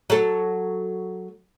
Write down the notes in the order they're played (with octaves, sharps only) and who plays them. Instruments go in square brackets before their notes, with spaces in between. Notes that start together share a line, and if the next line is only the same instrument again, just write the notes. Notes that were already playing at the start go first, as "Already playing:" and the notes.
[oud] F#3 A4